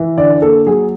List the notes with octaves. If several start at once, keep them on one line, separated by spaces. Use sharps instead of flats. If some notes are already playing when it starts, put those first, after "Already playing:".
Already playing: E3
D3 D5
A#3 A4
F#3 G#4